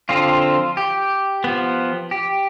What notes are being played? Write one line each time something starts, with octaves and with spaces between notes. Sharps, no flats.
D3 F3 C4 F4
G4
F3 B3
G4